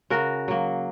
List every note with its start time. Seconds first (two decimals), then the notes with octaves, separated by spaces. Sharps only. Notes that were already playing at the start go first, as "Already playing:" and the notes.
0.10 C#3 F#4 A#4
0.48 F#3 A#3